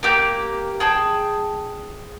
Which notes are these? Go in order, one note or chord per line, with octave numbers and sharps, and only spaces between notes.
A#3 G4 G6
G#4 G5 A5